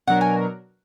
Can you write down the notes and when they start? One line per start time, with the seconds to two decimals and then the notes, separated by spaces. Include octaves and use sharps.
0.07 B2 F#3 D4 F#4 A#4 F#5
0.21 G#5